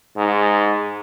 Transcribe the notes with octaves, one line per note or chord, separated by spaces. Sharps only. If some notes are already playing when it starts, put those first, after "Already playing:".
G#2